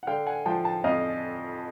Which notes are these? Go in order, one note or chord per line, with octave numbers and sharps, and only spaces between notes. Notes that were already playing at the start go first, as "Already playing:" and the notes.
F#5
D3 F5 G5
F#5 G#5
F3 G5 A5
G5 A5
F2 D#5 F5